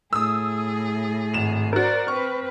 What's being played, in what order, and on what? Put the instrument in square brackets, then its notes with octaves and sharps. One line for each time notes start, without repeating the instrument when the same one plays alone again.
[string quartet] A2 G#4 [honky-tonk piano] D#6 E6
[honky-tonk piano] G#1 E7 F7
[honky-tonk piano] F#4 A#4 [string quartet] C5 D5
[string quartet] C4 B4 [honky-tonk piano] C#6 F6